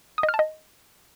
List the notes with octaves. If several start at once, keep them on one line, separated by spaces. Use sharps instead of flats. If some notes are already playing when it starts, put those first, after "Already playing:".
D#6
D#5
F6
A5
D#5